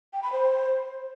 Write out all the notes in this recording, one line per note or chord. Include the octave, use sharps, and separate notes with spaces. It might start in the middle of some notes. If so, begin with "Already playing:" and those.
G5
B5
C5